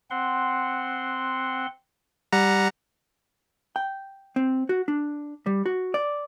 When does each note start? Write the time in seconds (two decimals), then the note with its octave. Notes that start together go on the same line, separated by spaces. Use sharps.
0.10 C4 F#5 C6
2.32 G3 F#5 A#5
3.76 G5
4.36 C4
4.69 F#4
4.88 D4
5.46 G3
5.66 F#4
5.94 D5